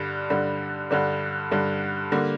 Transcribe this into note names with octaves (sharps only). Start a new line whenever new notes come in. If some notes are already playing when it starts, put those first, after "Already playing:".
Already playing: G2 D3 G3
G2 D3 G3
G2 D3 G3
G2 D3 G3
D3 G3 A#3